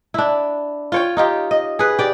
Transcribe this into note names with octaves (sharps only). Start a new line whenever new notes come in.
D4 E4
F4 C#5 G5
D#4 F4 G4
D#5
G#4 B4
G4 D5